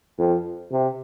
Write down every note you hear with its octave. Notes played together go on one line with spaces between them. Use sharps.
F2
C3